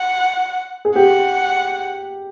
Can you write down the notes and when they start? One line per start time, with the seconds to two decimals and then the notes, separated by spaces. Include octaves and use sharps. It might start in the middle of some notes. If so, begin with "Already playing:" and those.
Already playing: F#5
0.85 G#4
0.96 G4 F#5